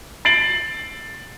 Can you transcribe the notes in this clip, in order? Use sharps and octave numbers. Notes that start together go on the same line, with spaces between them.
A6 C7 D7 F#7